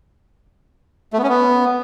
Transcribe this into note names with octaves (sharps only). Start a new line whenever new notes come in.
A3
B3
C#4
B3